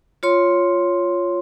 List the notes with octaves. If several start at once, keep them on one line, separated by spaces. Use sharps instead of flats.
F4 C#5 C6